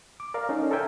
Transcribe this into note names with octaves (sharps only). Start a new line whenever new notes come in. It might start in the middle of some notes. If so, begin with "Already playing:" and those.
D6
A#4 D5 F5
C#4 D#4 A4
A4 A#4 C5 E5 G5 G#5